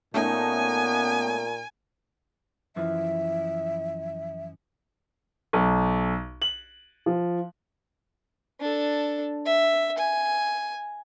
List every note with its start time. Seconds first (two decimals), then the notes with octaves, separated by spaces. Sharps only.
0.14 A#2 A3 B3 C#4 D#4 G#5
2.76 F#2 E3 F3 E5
5.53 B1
6.42 F#7
7.06 F3
8.61 D4 A4
9.46 E5
9.98 G#5